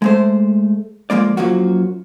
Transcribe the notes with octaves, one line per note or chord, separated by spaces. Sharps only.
G#3 A3 C5
F3 G#3 A#3 D5
F#2 F3 F#3 A#3 F#4